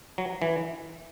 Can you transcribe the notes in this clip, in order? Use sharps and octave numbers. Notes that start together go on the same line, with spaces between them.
F#3
E3